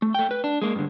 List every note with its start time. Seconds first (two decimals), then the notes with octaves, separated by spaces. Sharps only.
0.02 A3
0.15 A3 G5
0.31 B4
0.44 D4
0.62 G#3 A#3
0.75 G2 D3